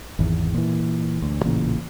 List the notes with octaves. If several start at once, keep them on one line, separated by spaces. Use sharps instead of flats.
G#1 E2
A#2 E3
D2
A1 A#2 C#3 E3